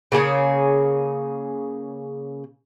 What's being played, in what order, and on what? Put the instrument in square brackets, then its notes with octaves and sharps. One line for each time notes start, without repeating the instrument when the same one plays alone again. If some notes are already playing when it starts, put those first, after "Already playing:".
[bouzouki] C#3 A#3 G#4 C#5